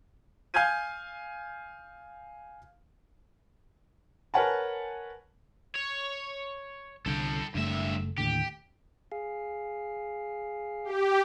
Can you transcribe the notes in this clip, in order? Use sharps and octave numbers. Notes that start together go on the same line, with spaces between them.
F5 G#5 F6 G6 G#6 D#7
A#4 B4 C#5 F#5 G#5 A5
C#5
C2 D3 A4 G5
F#1 G2 A3 E5
D#2 A2 D3 G4
G#4 F5
G4